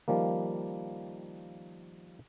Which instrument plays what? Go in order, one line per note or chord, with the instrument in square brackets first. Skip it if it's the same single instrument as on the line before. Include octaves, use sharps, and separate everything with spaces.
[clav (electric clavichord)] D#3 F3 G3 A#3